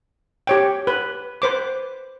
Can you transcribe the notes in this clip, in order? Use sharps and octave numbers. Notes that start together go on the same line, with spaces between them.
G4 C#5 G5
B4
B4 C5 D6